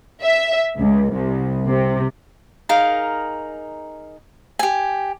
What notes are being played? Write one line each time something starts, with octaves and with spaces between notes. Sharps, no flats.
E5
C#2
C2
C3
D#4 G#4 A#4 F5
G4 G#5